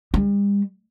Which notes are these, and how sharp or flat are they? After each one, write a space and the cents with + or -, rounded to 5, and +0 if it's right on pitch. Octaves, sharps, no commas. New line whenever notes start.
G3 +45